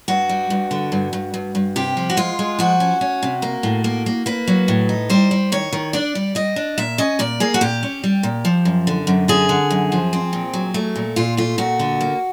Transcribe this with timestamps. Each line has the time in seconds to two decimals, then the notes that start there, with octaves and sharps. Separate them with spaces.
0.08 G2 F#4
0.29 G3
0.50 G2
0.71 D3
0.92 G2
1.13 G2
1.34 G2
1.55 G2
1.76 C3 G4
1.97 F3
2.10 F#4
2.17 G#3 F4
2.39 G#3
2.59 F3 F#4
2.80 C#4
3.01 C#4
3.23 C3
3.42 A#3
3.63 A2
3.84 A#3
4.06 A#3
4.26 A#3 B4
4.47 F#3
4.68 A2
4.89 D#4
5.10 G3 C5
5.31 G3
5.52 D#3 C#5
5.72 D#3
5.93 D4 D5
6.15 G3
6.35 G3 D#5
6.56 D4
6.78 A#2 E5
6.98 C#4 D#5
7.19 A#2 D5
7.40 A#3 G#4
7.54 F#4
7.61 A#2 G4
7.83 C#4
8.04 G3
8.23 A#2
8.45 F3
8.65 F#2
8.87 D3
9.07 F#2
9.28 D3 G#4
9.49 D3
9.70 F#2
9.92 F3
10.13 C4
10.33 A#2
10.53 F#3
10.74 A3
10.96 A#2
11.16 A#2 F4
11.37 A3 F4
11.58 A#2 F#4
11.79 D3
12.01 A#3